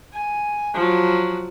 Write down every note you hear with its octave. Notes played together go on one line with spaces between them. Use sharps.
G#5
F3 F#3